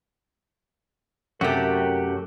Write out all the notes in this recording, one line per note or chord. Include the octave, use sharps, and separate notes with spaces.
F#2 C3 A3 F#4 G4 A#4